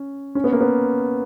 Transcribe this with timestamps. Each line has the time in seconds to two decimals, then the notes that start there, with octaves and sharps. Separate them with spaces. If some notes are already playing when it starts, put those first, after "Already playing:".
Already playing: C#4
0.35 C#4
0.44 B3
0.52 A#3
0.61 B3